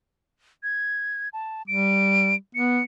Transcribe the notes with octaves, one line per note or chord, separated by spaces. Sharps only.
G#6
A5
G3 D7
B3 C#7